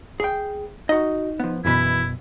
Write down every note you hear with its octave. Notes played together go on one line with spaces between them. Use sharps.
G#4 G5
D#4 F#4 D#5
F3 B3
B1 F#2 B2 E3 E4 B4